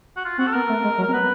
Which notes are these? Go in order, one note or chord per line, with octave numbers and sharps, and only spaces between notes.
F#4
F4
C4 F#4
A4
B3 A#4
A3
G#3
F#3
A#4
C4
B3 B4